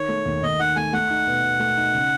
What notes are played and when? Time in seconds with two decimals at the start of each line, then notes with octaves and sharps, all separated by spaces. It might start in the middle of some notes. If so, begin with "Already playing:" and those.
Already playing: D#3 C#5
0.09 A3
0.26 D#2
0.43 D#2 D#5
0.60 D#3 F#5
0.76 A3 G#5
0.93 A3 F#5
1.10 D#4
1.27 B2
1.43 B2
1.60 A3
1.77 D#4
1.94 C#3